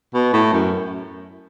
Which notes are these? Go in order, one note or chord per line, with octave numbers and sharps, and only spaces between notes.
B2
A2
F#2